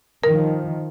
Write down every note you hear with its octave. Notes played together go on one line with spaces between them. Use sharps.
D#3 F3 A#4